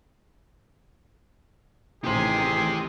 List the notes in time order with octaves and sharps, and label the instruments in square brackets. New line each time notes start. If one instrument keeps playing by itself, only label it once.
[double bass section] A1 D#3 [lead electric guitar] G4 C5 [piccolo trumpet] G#4